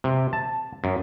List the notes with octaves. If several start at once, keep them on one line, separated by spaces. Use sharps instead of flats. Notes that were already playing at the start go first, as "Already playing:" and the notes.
C3
A5
F#2